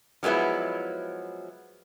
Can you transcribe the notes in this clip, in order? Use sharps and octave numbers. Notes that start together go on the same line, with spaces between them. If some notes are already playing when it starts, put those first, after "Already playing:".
F3 F#3 G#3 B3 E4